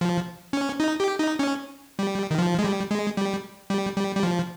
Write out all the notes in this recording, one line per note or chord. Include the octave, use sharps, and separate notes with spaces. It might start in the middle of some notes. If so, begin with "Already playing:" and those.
F3
C#4
D#4
G4
D#4
C#4
G3
D#3
F3
G#3
G3
G#3
G3
G3
G3
G3
F3